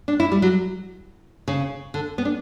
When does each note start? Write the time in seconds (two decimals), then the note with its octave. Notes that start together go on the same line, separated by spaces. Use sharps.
0.08 D4
0.20 E4
0.32 G3
0.42 F#3
1.48 C#3
1.94 D3
2.18 B3
2.25 D4